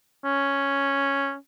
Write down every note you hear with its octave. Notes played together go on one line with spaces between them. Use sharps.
C#4